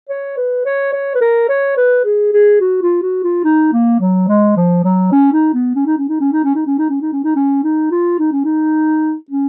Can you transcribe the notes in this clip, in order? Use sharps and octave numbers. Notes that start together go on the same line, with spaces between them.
C#5
B4
C#5
C#5
B4
A#4
C#5
B4
G#4
G#4
F#4
F4
F#4
F4
D#4
A#3
F#3
G#3
F3
F#3
C#4
D#4
B3
C#4
D#4
C#4
D#4
C#4
D#4
C#4
D#4
C#4
D#4
C#4
D#4
C#4
D#4
C#4
D#4
F4
D#4
C#4
D#4
C#4